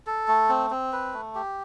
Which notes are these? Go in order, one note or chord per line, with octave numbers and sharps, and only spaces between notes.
A4
A3
C4
C4
B4
A3
G4